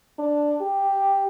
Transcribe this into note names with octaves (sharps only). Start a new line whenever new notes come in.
D4
G4